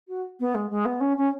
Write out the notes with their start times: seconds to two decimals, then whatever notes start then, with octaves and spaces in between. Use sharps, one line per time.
0.08 F#4
0.40 B3
0.55 G#3
0.70 G#3
0.85 B3
1.01 C#4
1.17 C#4